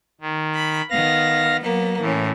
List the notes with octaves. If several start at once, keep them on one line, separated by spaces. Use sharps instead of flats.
D#3
B5
D#3 B3 F5 A#6
F#3 A#3 B3
A2 E3 C#4